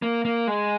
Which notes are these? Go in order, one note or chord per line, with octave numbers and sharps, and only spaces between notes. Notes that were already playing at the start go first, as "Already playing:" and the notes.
A#3
A#3
G#3